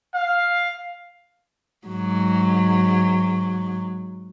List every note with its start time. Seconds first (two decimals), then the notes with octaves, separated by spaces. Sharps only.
0.13 F5
1.87 G#2 F#3